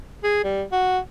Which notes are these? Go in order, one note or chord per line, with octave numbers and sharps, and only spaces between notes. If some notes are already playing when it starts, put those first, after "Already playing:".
G#4
G3
F#4